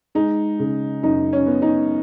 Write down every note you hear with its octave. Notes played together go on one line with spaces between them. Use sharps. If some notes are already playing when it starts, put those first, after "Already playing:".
G#3 D#4
C#3
F#2 D#4
C#4
B3
D#4